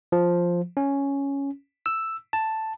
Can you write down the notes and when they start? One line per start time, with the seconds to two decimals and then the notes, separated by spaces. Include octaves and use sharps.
0.12 F3
0.77 C#4
1.86 E6
2.33 A5